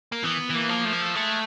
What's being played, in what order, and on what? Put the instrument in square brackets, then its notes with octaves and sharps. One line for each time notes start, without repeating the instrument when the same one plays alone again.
[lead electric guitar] A#3
[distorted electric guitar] E3 [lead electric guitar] B3
[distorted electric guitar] E3 [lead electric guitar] A#3
[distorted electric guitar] F3
[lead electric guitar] A3
A#3
A3
[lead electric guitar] G#3 [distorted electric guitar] A3